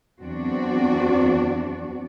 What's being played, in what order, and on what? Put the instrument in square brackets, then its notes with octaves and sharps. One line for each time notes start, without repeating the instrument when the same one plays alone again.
[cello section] E2 F#3 C4 D4 F#4 D5